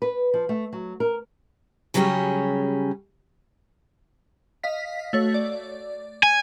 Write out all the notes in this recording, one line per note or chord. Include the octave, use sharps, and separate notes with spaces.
B4
F3
A3
F#3
A#4
C#3 F#3 G3 C#4 G4 G#4
D#5 F5 B6
A3 F#4 C#5
D5
G#5